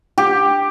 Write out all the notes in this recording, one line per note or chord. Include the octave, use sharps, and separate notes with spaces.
G4